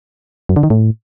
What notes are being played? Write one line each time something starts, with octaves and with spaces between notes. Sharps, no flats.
F#2
D3
D#3
A2